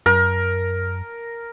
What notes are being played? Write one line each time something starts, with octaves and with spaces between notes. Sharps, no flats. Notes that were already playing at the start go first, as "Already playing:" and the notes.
F#2 A#4